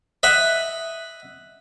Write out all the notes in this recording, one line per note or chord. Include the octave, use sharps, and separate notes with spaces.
D#5 E5 F#5 B5